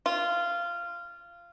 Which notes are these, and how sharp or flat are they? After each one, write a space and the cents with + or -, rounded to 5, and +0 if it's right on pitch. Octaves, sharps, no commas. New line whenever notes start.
F4 -15